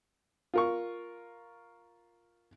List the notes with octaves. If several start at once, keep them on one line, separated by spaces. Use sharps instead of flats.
F4 A#4 C#6